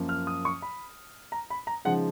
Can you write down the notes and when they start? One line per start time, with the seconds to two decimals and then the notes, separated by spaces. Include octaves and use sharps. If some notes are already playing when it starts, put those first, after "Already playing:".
Already playing: F#2 F3 A#3
0.09 F6
0.27 D#6
0.45 C#6
0.62 B5
1.32 A#5
1.50 B5
1.67 A#5
1.85 C#3 F3 G#3 D#4 F#5